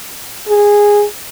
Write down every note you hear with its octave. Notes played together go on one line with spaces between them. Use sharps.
G#4